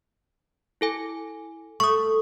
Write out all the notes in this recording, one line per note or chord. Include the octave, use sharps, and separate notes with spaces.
E4 A4 G#5
A3 C#6 D#6